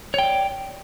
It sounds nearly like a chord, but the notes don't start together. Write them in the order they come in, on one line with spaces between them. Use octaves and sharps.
C#5 G5 D5